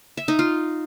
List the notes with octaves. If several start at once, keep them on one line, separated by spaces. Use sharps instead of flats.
E5
D#4
F4